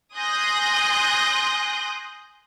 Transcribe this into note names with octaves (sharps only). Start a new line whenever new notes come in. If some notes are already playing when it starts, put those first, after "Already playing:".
G#5 C6 D#6 F#6 G6 A#6